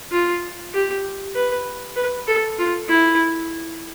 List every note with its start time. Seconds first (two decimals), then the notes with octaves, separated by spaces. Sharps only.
0.12 F4
0.74 G4
1.35 B4
1.96 B4
2.27 A4
2.59 F4
2.89 E4